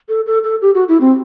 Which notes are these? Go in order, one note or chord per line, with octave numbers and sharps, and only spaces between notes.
A4
A4
A4
G4
F#4
E4
C4